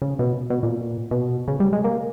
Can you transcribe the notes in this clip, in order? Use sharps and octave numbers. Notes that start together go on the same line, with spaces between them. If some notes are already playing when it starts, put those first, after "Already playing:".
C#3
B2
B2
A#2
B2
C#3
G3
G#3
A#3